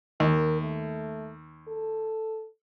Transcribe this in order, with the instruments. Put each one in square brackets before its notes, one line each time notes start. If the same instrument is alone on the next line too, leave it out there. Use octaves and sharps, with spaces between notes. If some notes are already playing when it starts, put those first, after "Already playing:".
[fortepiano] D#2 [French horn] A#4
[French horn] A3
A4